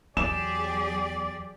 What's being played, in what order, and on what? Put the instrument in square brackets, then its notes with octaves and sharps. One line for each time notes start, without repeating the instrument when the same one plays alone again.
[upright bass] E2 [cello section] F#3 G4 G#4 [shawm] D5 [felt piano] E7